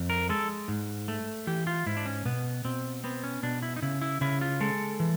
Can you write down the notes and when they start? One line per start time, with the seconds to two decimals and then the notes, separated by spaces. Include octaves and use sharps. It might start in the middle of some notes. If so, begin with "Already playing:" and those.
Already playing: F2
0.10 A#4
0.29 G#3 A4
0.68 G#2
1.08 A3
1.47 E3 G4
1.67 F4
1.86 G#2 E4
1.97 D4
2.06 C#4
2.25 B2 B3
2.65 B2 C4
3.04 B3 C4
3.24 C#4
3.43 B2 D4
3.63 E4
3.76 D#4
3.82 C#3 E4
4.02 E4
4.21 C#3 E4
4.41 F4
4.61 G#3 A4
5.00 E3